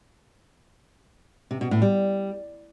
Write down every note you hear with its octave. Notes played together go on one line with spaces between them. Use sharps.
C3
B2
A2
G3